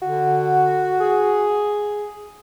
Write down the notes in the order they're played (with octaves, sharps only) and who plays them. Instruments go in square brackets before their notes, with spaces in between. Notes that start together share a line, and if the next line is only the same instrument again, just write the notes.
[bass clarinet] D3 [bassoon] F#4
[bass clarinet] G#4